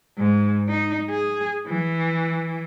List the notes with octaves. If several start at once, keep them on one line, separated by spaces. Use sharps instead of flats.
G#2
D#4
G#4
E3